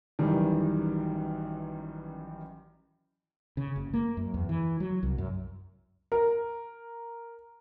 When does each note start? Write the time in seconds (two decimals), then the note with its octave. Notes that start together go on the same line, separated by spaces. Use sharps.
0.19 A1 F#2 D#3 E3 G3
3.57 C#3
3.76 F#1
3.94 A#3
4.17 F#2
4.34 E2
4.49 E3
4.80 F#3
5.03 C2
5.18 F#2
6.12 A#4